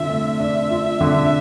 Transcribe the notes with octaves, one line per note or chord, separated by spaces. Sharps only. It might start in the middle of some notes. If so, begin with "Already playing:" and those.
Already playing: D3 F4 E5
A3
D4 E5
F4
D3